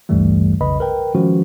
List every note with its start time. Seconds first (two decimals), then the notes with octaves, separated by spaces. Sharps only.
0.09 A1 D2 G2 E3 G3 A3
0.61 B1 F2 C#3 B4 D#5 B5
0.80 A#4 B4 G5
1.15 D#3 F3 G#3 C#4 F#4